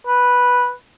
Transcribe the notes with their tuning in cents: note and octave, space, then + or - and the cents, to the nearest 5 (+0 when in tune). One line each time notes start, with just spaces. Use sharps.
B4 -5